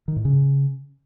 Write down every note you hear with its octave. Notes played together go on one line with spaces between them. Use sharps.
D#3
A2
C#3